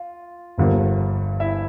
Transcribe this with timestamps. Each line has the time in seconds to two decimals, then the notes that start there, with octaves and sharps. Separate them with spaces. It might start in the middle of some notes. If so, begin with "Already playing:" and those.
Already playing: F4
0.58 G1 G2 D3 F3 A#3
1.40 E4 E5